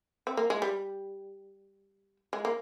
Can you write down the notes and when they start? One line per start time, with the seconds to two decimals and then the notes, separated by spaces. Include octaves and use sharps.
0.27 C4
0.37 A#3
0.50 G#3
0.62 G3
2.33 G#3
2.45 A#3